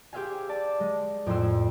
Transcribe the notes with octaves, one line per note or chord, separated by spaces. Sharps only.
G4 G#4 C5 E5 F5 G#5
D5 A5
G#3
F2 A2 G#5 C6 E6